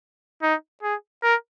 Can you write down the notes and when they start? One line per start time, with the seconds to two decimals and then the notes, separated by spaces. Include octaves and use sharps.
0.42 D#4
0.83 G#4
1.23 A#4